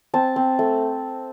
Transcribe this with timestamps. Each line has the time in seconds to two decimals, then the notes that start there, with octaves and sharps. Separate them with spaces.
0.14 C4 A5
0.36 C4
0.59 A3